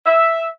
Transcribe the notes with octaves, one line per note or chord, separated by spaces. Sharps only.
E5